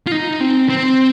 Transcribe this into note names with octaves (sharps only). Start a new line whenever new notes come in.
F4
D#4
C4
C4